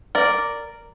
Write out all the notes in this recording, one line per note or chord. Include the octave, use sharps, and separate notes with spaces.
A#4 D5